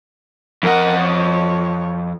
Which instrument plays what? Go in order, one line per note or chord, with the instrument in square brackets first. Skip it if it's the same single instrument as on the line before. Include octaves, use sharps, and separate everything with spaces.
[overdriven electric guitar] F2 D#5 [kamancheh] A#4 F#5
[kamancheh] C#5